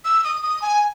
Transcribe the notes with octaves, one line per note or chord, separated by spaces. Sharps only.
E6
D#6
D#6
G#5